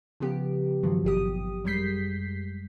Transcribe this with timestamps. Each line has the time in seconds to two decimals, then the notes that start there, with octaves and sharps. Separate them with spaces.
0.20 C#3 F3 B3 G4
0.83 G2 D#3 F3 F#3
1.04 G#1 B2 G4 D#6
1.64 F#2 G3 G#3 G6 B6 C7